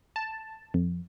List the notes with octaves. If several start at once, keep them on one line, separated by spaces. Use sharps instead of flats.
A5
F2